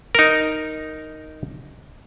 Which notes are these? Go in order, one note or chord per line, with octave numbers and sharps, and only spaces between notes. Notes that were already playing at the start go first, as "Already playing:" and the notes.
D#4 A#4